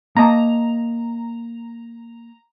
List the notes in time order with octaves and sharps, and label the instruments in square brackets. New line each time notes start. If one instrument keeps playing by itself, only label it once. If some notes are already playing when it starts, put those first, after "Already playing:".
[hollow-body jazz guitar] A#3 D#5 A5 [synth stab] A#5